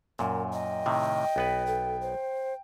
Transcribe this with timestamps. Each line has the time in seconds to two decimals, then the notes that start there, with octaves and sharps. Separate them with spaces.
0.19 F#2 A#2 A#4
0.53 D#5 G5
0.86 A2 C3 D#3
1.36 B1 B3 B4
1.67 A4
2.01 C5